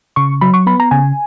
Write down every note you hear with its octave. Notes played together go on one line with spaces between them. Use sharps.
C#3 C#6
F#3 B5
C#6
B3 B5
A#5
C#3 G#5